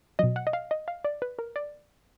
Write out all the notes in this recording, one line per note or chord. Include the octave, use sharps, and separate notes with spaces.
B2 F#3 D#5
F#5
D#5
F5
D#5
F5
D5
B4
A#4
D5